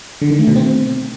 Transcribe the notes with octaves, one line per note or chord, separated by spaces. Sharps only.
D3
D#3
A3
B2
C4